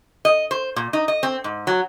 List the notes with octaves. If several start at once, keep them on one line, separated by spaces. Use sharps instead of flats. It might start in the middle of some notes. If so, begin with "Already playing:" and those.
D#5
C5
A#2
D#4
D#5
C4
G#2
F#3